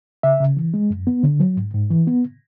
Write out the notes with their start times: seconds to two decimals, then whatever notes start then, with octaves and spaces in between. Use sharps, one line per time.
0.23 C#3 E5
0.40 C#3
0.57 E3
0.74 G#3
0.90 F#2
1.07 B3
1.23 D3
1.40 F#3
1.57 G#2
1.74 G#2
1.90 E3
2.07 B3